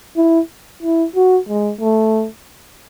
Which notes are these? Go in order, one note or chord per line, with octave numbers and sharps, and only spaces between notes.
E4
E4
F#4
G#3
A3